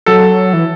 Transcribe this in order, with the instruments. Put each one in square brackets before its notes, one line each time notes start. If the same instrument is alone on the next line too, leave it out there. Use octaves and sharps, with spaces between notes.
[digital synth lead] F#3 [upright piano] A4
[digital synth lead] E3